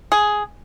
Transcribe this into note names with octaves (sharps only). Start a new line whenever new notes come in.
G#4